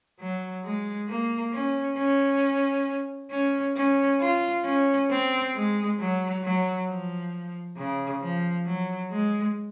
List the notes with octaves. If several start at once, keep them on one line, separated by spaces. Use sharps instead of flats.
F#3
G#3
A#3
C#4
C#4
C#4
C#4
F4
C#4
C4
G#3
F#3
F#3
F3
C#3
F3
F#3
G#3